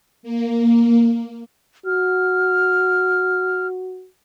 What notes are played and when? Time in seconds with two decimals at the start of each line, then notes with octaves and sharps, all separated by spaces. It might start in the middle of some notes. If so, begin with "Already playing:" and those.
0.23 A#3
1.86 F#4 F6